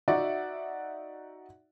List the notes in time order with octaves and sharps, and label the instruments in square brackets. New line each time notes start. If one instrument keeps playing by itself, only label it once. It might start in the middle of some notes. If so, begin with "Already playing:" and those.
[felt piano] D#4 F#4 D5 E5 F#5